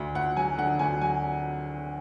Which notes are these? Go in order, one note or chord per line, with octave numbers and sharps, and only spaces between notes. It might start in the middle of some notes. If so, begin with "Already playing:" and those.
Already playing: D2
D2 F#5
F#3 G#5
D3 F#5
D2 G#5
F#3 G#5